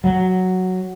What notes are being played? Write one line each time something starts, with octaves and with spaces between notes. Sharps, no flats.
F#3